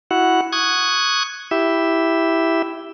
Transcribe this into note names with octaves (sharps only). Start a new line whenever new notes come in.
E4 F#4 F#5
C#6 D#6 F#6 G#6
E4 G4 E5